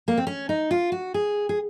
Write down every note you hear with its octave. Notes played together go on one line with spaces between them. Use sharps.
A#3
C4
C#4
D#4
F4
F#4
G#4
G#4